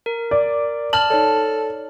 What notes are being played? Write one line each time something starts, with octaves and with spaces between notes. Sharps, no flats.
A#4
D5
A5 F6 F#7
D#4 A4 C#5 D5